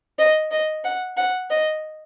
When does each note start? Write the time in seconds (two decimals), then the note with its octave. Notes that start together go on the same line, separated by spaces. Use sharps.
0.19 D#5
0.51 D#5
0.84 F#5
1.17 F#5
1.50 D#5